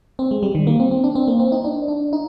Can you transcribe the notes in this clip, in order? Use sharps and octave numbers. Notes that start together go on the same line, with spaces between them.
C4
G#3
G3
D#3
A#3
C4
C4
D4
C4
A#3
C4
D#4
D4
D4
D#4